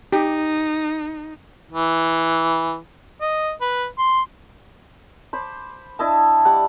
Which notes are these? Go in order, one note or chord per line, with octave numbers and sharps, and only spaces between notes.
D#4 G4
E3
D#5
B4
C6
C5 B5 D6
D4 E4 D#5 A5
G3 F#5 A5